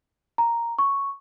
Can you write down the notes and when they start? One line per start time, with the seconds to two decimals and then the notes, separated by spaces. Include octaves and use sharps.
0.38 A#5
0.79 C#6